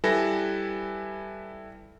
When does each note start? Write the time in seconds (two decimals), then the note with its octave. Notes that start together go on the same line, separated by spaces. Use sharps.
0.04 G3 E4 A4 B4 G#5 A#6